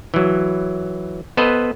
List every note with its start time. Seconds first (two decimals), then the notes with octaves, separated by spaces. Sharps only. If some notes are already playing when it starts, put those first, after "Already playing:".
0.14 E3 F#3
1.37 B3 A4 B4 C5 D#5